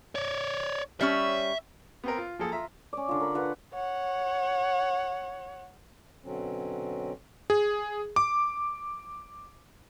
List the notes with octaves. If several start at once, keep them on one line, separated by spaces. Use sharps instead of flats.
C#5 D5
G3 C#4 C#5 E5
B3 C4 A#4
F4
F3 A#3 G#4 A4
F4 E5 A#5
C#4 D5
D3 F4
A#4 B5
F4 B4 F#5
C#5 F#5
B2 D3 F#3 C4 C#4
G#4
D6